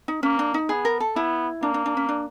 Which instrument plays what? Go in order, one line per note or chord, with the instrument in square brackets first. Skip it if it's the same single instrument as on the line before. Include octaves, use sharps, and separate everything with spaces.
[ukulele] D#4
[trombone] A#3 [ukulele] C#4
[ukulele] D4
D#4
[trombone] B3 [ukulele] G#4
[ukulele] A#4
A4
[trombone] B3 [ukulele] E4
[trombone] A#3 [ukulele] D4
[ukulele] D4
D4
C#4
D4